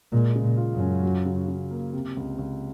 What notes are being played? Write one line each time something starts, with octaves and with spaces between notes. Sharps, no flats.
A#2 G#3
C#3
A#2
F4
F#2
C#4
F#3
C#3
C#3
A#3
C3
C#2
C#2